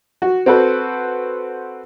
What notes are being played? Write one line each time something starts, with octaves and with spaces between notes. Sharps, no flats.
F#4
C4 F#4 A4 B4 C5